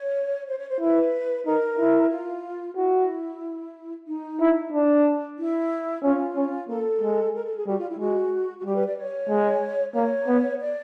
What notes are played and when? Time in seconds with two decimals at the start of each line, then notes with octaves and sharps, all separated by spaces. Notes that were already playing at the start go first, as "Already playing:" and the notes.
Already playing: C#5
0.48 C5
0.58 C#5
0.69 C5
0.80 E4 B4
1.45 D#4 A#4
1.79 E4
2.11 F4
2.76 E4 F#4
4.08 D#4
4.40 E4
4.72 D4
5.38 E4
6.03 C#4 F4
6.36 C#4
6.68 A#3 A4
7.01 G#3
7.34 A#4
7.45 A4
7.56 G#4
7.67 G3 F#4
7.78 F4
7.88 E4
7.99 G#3 F#4
8.57 F#4
8.64 G3 G4
8.75 B4
8.86 D5
8.97 C#5
9.29 G#3
9.94 A#3 C#5
10.27 B3
10.60 D5